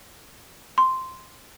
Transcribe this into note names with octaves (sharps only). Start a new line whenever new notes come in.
C6